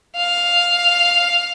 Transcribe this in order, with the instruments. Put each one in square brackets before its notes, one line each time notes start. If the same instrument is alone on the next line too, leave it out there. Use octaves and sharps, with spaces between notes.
[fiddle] F5